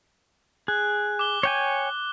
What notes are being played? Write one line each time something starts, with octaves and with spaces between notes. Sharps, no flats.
G#4 F#6
D6 G7
C#5 G5 G#5